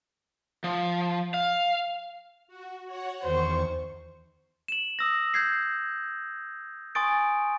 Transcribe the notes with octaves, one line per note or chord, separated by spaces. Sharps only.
F3
F5
F#4
F#4 C#5 F#5
E2 D#3 C5 C#6
E7 F#7
D#6 E6 A#6
G6 G#6 C7
G#5 C6 C#6 D#6 A6 D7